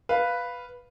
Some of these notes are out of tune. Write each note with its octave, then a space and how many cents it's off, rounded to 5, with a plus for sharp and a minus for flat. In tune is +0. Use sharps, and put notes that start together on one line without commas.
B4 +0 F5 +0